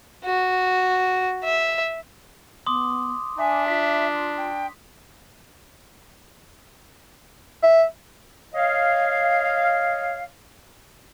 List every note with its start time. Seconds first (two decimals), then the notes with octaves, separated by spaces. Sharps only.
0.25 F#4
1.44 E5
2.66 B3 C6 D6 D#6
3.38 D4 E5 G#5
3.68 F4 B6
4.38 G5
7.63 E5
8.54 C#5 D#5 F5